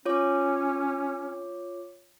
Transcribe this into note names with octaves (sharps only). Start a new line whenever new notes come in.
C#4 F4 C#5 D6